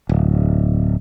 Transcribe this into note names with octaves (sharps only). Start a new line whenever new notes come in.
D1